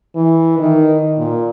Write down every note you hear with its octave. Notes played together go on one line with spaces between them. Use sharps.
E3
D#3
A#2